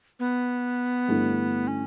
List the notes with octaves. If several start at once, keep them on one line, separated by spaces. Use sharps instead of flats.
B3
G2 D3 A3 E4
C#4